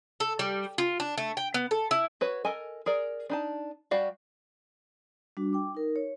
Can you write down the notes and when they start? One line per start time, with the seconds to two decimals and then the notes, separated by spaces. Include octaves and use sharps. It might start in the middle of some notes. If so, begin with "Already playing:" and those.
0.20 A4
0.39 G3
0.78 F4
1.00 D4
1.18 A3
1.37 G5
1.54 B3
1.71 A4
1.91 E4
2.21 F#4 B4 C#5
2.45 A4 A#4 D#5 G#5
2.86 G#4 A#4 D5
3.30 D4 D#4 A5
3.91 G3 F#4 D5 F5
5.37 G3 D4 F#4
5.53 G5 D6
5.75 D#4 A#4
5.96 C#5